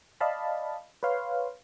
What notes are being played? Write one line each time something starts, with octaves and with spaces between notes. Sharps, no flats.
D5 D#5 F5 A5 B5
B4 C#5 F5 C6